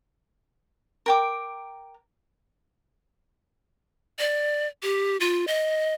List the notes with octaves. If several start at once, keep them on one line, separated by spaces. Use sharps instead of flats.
A#4 G5 D6
D5
G4
F4
D#5